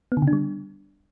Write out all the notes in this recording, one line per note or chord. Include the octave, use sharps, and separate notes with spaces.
B3
D3
C#3
D4
G3